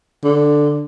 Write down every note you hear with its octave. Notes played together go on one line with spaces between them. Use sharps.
D3